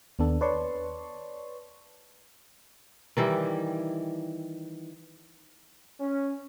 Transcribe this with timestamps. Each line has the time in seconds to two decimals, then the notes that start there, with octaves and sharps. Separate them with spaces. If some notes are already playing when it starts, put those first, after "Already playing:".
0.19 D#2 B3 D4 A4
0.41 B4 C#5 D5 A5 C6 C#6
3.17 D#3 E3 G3 E4
6.00 C#4